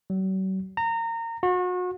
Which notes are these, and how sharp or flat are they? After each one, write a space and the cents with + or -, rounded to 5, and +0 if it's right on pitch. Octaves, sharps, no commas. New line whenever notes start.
F#3 +45
A#5 -25
F#4 -35